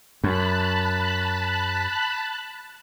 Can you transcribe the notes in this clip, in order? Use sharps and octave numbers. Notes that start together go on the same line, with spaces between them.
F#2 A5 B5 F#6